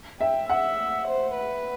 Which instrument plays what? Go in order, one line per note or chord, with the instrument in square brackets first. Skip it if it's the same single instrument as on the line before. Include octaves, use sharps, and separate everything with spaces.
[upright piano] E5 [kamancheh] G5
[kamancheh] E5 [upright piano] F#5
[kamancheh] C5
B4